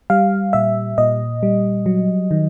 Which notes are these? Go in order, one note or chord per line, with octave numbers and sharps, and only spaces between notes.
G3 F5
A#2 E5
A#2 D#5
G3
F#3
D#3